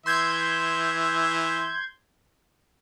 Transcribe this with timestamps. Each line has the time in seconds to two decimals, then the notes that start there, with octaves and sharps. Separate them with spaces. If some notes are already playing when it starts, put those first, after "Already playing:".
0.06 E3 E5 C6 G6 G#6